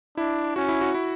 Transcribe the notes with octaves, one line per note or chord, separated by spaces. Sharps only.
D4 E4
C#4 F#4
E4
F#4
E4